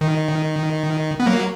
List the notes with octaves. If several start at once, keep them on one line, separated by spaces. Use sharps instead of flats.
D#3
B3
F#3 A#3